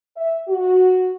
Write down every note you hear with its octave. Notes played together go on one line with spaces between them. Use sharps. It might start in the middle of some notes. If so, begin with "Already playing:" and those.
E5
F#4